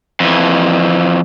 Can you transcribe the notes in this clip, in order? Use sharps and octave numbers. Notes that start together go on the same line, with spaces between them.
F2 E3